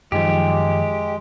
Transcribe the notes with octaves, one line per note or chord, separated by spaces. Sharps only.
F#2 D#3 F3 G#3 G4